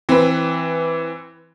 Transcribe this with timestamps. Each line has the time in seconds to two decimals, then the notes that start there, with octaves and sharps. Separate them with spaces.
0.09 E3 C4 B4